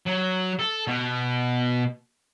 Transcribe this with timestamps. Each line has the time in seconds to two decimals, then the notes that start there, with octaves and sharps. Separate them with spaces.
0.06 F#3
0.59 A4
0.87 B2